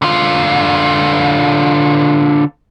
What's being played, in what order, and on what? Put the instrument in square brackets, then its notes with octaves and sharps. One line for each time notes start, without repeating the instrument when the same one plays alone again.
[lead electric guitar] D3 F4